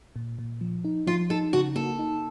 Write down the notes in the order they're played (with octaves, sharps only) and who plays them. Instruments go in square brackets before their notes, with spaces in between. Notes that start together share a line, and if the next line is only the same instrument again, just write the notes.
[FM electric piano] A#2
A#2
F3
D#4
[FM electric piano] F3 [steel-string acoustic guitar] F4
[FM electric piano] D#4 [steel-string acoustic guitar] A4
[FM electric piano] C#3 [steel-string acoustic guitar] F#4
[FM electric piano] A#3 [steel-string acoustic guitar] A4
[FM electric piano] D#4